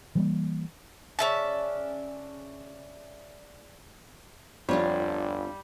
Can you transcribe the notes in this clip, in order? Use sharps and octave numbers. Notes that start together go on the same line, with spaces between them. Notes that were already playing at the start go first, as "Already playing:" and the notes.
E3 G3 A#3
C#3 C#4 D4 E5 A5
G1 F2 G3 D4 F4 C#5